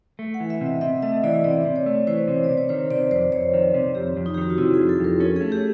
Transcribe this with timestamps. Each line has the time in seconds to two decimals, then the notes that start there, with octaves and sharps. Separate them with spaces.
0.19 A3
0.34 F#5
0.40 E3
0.50 E5
0.61 C3
0.66 D#5
0.81 C3 E5
1.02 A3 D#5
1.23 E3 D5
1.44 C3 D5
1.65 C3
1.76 C#5
1.86 A3
2.07 E3 C5
2.28 C3
2.44 D5
2.49 C3
2.57 C#5
2.69 D#3 C5
2.90 C3 D5
3.11 F2 C5
3.32 F2 C#5
3.54 D#3
3.74 C3
3.95 F2 G4
4.17 F2
4.26 D#4
4.34 G4
4.37 D#3 F#4
4.50 F4
4.58 C3 E4
4.74 G#4
4.79 F2
4.89 A4
5.00 F2 A#4
5.20 C#4 A4
5.36 A3 G#4
5.52 G4